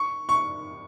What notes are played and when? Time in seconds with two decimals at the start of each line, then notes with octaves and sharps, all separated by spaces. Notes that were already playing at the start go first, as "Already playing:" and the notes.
Already playing: C#6
0.29 C#6